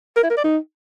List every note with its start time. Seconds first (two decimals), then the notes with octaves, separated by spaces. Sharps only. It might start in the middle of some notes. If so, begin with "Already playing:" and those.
0.17 A#4
0.23 E4
0.30 A#4
0.37 D5
0.44 D#4